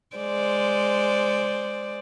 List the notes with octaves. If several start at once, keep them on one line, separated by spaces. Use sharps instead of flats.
G#3 C5 D5